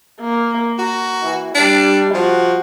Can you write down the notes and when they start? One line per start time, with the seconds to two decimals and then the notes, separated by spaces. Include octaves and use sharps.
0.21 A#3
0.79 F#4 A#5
1.23 E3
1.55 G3 D4
2.14 F3 F#4